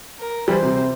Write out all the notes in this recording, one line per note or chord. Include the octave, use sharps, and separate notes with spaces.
A#4
E3 G3 C5
C3